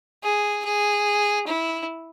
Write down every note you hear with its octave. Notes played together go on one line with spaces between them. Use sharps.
G#4
G#4
E4